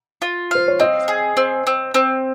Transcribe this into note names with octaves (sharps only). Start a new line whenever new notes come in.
F4
C5 F5
C#5
C4 D#5
G#4
C4
C4
C4